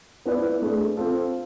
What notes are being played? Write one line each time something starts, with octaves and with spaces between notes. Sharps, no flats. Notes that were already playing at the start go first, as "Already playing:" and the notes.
B3 E4 B4 D5
A3 D4 G#4
C4 F4 A4